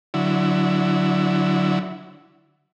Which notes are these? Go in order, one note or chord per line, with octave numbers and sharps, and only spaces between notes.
D3 F#3 E4